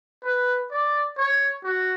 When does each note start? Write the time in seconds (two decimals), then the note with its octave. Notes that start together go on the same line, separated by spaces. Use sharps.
0.24 B4
0.71 D5
1.17 C#5
1.64 F#4